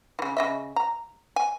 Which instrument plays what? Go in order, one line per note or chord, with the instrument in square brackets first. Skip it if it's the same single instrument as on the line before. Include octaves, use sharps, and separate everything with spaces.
[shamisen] C#3 E3
C#3 D#5 E5
A#5
G#5